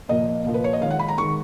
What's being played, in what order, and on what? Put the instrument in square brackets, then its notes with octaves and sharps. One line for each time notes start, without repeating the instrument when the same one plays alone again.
[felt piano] A#2 F3 A#3 D#5
A#2 F3 A#3
B4
C#5
D#5
D#3 F5
G#3
F#5
B5
A#5
D#3 G#3 C#6